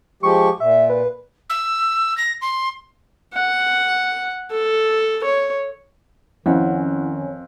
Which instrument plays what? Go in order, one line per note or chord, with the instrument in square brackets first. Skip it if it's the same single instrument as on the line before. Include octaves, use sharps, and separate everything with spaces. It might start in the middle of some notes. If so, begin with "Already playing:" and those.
[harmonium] F3 G#3 G4 [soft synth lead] C#6
[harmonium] A#2 [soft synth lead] E5
[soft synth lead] B4
[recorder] E6
A#6
C6
[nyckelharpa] F#5
A4
C#5
[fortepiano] F2 [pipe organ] D#3 [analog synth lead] C#4 [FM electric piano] E4 F#5